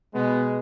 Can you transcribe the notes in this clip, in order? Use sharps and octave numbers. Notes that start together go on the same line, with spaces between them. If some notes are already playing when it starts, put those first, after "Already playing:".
B2 G#3 B3